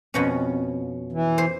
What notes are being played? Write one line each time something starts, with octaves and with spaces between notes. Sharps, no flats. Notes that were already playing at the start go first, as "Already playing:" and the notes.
F2 B2 C#4
E3
C5